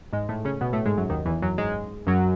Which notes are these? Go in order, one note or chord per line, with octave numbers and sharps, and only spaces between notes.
G#2 G#3
A2 A3
C#3 C#4
B2 B3
A2 A3
G#2 G#3
F#2 F#3
D#2 D#3
E2 E3
F#2 F#3
G#2 G#3
F#2 F#3